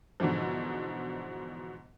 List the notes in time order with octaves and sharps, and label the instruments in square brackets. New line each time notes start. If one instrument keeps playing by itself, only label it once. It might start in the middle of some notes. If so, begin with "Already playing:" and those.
[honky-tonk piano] G#2 B2 D3 E3 F3